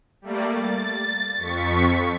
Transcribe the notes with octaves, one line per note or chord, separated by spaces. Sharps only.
G3 A3 A#3 D5
A6
F2 C#6 B6